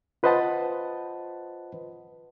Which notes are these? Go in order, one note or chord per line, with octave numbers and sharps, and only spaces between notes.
F4 B4 C5 D#5 F#5 A5